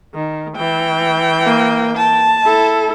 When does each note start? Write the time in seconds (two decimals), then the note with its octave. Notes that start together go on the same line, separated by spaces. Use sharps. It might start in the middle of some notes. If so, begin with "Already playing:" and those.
0.14 D#3
0.56 E3 G5
1.45 A#3
1.97 A5
2.43 E4 A4